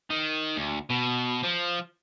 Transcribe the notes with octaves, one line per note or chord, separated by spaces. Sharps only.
D#3
D2
B2
F3